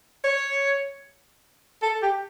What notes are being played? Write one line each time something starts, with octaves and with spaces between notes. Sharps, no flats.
C#5
A4
G4